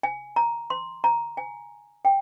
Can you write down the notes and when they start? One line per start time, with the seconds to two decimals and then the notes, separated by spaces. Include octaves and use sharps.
0.03 G#5
0.36 A#5
0.70 C6
1.04 A#5
1.37 G#5
2.05 G5